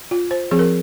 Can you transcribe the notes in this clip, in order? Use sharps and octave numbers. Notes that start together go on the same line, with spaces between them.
F4
C5
F3 C4 G#4
A#4